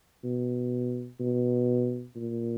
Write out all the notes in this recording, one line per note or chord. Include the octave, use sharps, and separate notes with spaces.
B2
B2
A#2